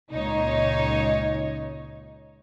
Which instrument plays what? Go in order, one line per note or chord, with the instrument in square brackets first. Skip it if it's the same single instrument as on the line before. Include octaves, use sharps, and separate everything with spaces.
[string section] C#2 A#2 D#4 C#5